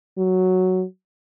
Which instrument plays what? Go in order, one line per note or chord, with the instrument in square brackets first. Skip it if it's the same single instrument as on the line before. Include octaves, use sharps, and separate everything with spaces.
[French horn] F#3